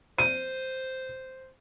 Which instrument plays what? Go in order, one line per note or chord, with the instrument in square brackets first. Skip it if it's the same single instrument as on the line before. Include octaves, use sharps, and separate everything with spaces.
[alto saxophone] C5 [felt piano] D#7